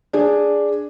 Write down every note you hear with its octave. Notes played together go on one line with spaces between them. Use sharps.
D4 G#4